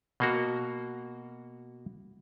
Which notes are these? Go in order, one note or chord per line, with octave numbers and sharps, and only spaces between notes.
B2 A#3 F#4